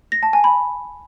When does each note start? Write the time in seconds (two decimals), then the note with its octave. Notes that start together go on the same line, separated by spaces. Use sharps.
0.12 A#6
0.23 A5
0.33 G#5
0.44 B5